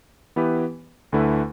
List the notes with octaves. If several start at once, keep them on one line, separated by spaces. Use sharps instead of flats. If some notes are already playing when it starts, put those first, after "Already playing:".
E3 B3 E4 G4 B4
D2 D3 A3 E4 B4